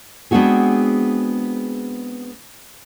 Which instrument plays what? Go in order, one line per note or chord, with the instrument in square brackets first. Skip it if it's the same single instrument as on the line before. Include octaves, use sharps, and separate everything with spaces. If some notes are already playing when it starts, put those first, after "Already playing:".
[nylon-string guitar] G#3 B3 C4 D4 F#4 G#4